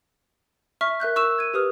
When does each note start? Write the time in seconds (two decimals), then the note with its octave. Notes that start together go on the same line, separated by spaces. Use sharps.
0.81 E5 C#6 F6 B6
1.00 A#4 E5 F#6 G6
1.16 C#6 E6 F#6 E7
1.38 G#6 D#7
1.54 G4 B4 D#6 F6